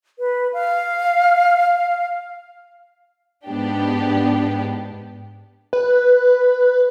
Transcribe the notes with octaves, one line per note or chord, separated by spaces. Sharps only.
B4
F5
G#2 B3 D4 G4
B4